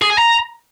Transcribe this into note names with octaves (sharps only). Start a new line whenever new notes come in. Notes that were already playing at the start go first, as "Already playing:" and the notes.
G#4
G#5
A#5